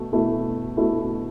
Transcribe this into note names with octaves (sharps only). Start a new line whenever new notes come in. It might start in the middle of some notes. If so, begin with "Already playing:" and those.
Already playing: B2 A3
B2 A3 E4
B2 A3 E4